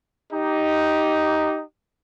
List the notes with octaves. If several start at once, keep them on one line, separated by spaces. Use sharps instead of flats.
D#4 G4